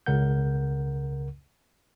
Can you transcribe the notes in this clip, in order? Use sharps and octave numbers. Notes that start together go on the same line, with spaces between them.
C#2 C#3 A#4 F#5 G6